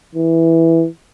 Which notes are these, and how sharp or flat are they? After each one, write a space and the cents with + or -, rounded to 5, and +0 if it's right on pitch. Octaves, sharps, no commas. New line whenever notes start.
E3 +0